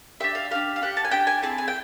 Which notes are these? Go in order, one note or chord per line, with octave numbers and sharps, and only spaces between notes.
D4 G4 E5
F5
D4 G4 F5
F5
D4 G4 F#5
A5
G#5
D4 G4 G5
G#5
C4 E4 G#4 A5
G#5
G5